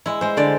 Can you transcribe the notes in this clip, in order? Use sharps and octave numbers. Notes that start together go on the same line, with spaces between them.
G#3 E4
G#3 C5
D3 D5